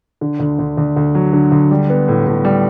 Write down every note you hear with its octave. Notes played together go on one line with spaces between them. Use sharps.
D3
D2
D2
D2
D2
F#3
D3
D2
G3
B3
A2
A2
G3